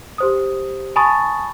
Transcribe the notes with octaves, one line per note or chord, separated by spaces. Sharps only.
G4 C5 D#6
G#5 A5 B5 C#6 D#6 A6